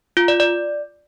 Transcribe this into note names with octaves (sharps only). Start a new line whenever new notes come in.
F4
D5
D5